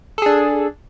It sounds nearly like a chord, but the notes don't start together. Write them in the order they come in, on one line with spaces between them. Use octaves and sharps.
A4 G#4 D4